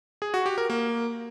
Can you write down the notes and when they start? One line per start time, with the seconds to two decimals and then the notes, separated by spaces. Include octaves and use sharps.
0.22 G#4
0.34 F#4
0.46 G4
0.58 A#4
0.70 A#3